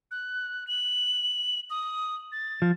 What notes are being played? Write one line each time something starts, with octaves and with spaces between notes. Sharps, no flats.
F#6
F#7
D#6
A6
F3